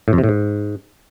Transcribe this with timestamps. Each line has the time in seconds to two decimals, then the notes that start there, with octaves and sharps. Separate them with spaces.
0.08 A2
0.13 F2
0.18 C3
0.24 A2
0.29 G#2